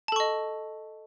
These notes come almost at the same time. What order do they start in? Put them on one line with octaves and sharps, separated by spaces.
A5 A4 C#6 D#5